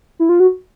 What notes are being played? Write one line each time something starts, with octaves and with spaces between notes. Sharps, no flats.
E4
F4
F#4